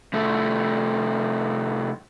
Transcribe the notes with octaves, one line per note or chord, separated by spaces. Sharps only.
C2 A3